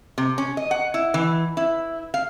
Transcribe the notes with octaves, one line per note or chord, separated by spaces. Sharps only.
C3
C#4
D#5
F#5
E4
E3
E4
F5